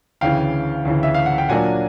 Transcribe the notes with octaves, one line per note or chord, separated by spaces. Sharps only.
D2 C#3 E3 F5 G5
D2 C#3 E3
E5
F5
F#5
G5
A#2 F#3 A#3 D4 F#5 G#5